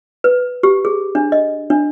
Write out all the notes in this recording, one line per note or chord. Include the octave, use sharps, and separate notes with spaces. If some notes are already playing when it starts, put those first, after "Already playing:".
B4
G4
G#4
D4
D#5
D4